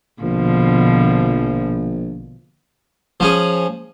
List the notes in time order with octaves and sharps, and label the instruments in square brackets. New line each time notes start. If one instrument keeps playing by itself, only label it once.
[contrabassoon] A#1 [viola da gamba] B2 D3 F3
[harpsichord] F3 C#4 G#4